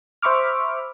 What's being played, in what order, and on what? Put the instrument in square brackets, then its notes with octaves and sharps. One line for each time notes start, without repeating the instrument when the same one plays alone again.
[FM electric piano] C5 E5 B5 C#6 D6 F6